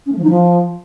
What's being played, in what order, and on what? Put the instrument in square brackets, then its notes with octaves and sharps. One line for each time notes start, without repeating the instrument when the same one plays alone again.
[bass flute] C#4
A3
F3
D#4
F3